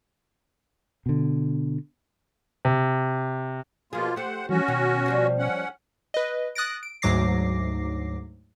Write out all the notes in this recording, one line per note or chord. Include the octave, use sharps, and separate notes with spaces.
B2 D3
C3
B2 F3 A#3 F4 G#4
A3 G4 C5 F#5
E3 F3 G3 C#4 F#4
B2 D#3
F3 G3 C5
C#4 F#5
B4 D#5
D#6 F#6 A6 A#6 D7
D7
D2 G#2 F#3 D6 A#6 C7